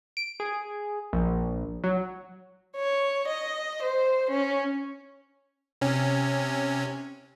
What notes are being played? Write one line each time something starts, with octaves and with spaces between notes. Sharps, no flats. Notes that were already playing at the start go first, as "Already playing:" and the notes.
D7
G#4
A#1
F#3
C#5
D#5
C5
C#4
C3 C#4